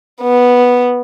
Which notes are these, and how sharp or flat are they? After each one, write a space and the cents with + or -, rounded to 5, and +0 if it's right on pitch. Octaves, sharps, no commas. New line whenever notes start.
B3 -5